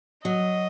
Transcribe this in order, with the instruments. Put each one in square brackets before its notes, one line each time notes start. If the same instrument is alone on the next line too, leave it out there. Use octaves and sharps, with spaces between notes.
[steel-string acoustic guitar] F#3 [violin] D#5